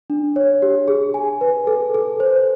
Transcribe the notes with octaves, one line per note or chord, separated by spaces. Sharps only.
D4
C#5
G4
G#4
G#5
B4
A4
A4
C5